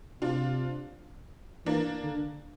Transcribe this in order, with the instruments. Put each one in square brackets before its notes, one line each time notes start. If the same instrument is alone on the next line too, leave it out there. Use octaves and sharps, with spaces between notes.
[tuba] C3 [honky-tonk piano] D4 F4
[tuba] E3 [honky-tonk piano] A#3 D4
[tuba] D3